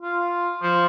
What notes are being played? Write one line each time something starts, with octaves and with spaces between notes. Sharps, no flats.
F4
F3